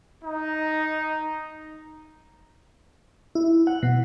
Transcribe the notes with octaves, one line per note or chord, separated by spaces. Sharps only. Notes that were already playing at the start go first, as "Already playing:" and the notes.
D#4
E4
F#5
B2